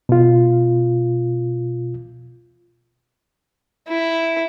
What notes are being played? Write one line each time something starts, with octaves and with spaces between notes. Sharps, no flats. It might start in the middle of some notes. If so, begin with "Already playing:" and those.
B2 F4
E4